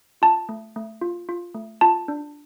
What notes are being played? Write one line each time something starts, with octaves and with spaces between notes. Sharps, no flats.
F4 A5
A3
A3
F4
F4
A3
F4 A5
D4